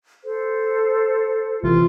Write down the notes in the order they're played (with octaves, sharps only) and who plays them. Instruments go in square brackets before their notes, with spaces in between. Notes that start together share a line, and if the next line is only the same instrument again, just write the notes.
[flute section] A4 C5
[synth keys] A1 C3 E3 [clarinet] F4